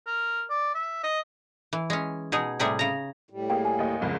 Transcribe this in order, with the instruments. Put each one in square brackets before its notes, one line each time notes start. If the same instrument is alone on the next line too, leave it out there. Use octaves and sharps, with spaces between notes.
[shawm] A#4
D5
E5
D#5
[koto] E3
G#3 C#4
B2 D#4 G#4
A2 C3 G3 G#4 G#5
C#3 A#5
[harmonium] A2 G3
[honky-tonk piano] A#3 G#4 [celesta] G5
[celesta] G#5
[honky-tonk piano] D#2 D#5
[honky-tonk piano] C2 F2 G#2 [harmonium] C#3